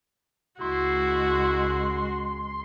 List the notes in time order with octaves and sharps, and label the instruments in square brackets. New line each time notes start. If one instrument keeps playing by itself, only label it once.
[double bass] C#2 G#3 [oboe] E4 [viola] F#4 [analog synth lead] C6